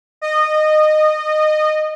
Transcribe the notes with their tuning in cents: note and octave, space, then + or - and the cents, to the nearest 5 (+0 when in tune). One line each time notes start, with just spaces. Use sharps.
D#5 -20